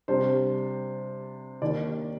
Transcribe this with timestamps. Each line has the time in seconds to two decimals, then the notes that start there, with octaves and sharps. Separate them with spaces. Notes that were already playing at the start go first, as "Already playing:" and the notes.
0.08 C3 G3 D4 C5
1.62 D#2 D#3 A#3 D4 D5